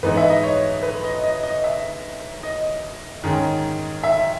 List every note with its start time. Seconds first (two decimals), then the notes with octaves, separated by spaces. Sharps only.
0.03 G#2 E3 G#3 B3 D#4 B4
0.17 E5
0.30 D#5
0.43 C#5
0.83 B4
1.04 D#5
1.24 D#5
1.43 D#5
1.64 E5
2.43 D#5
3.24 G#2 D#3 G#3 C#4
4.04 E5